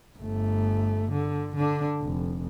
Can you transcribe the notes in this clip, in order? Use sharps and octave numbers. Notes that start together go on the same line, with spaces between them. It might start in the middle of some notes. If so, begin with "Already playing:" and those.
G1 A3
D3
D3 D4
F1